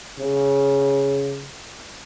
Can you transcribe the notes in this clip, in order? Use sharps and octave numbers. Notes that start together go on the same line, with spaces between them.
C#3